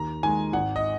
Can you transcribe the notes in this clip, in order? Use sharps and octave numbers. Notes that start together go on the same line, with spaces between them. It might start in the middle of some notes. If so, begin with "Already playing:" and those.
Already playing: D#2 A#5
D#3 G#3 G#5
G#1 F#5
D#5